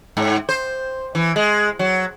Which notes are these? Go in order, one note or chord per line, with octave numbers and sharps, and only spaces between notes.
G#2
C5
E3
G#3
F#3